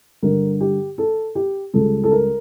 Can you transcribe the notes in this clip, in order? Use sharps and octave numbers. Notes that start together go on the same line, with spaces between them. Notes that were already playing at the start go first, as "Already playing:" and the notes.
G2 D3 G3 A#4
G4
A4
G4
C#2 C#3 G3 A4
A4
A#4